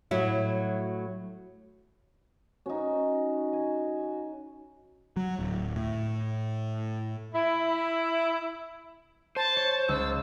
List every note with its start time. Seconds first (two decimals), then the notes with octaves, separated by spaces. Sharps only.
0.11 A2 F#3 E4
2.66 C#4 D#4 F#4
3.53 G#5
5.17 F#3
5.39 D1
5.76 A2
7.35 E4
9.36 C5 A5
9.56 C#5
9.89 C#2 E6